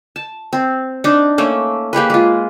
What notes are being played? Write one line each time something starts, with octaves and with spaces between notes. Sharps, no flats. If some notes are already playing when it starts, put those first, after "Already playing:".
A5
C4
D4 D#4
A3 A#3 C#4
A#3 G4 G#4 B4
G#3 F4